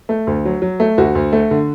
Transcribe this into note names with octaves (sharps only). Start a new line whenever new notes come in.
A3
D2
F#3
F#3
A3
D2 F#4
D2
A3
D3